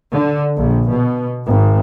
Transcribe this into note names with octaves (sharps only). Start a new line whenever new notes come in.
D3
A#1
B2
G#1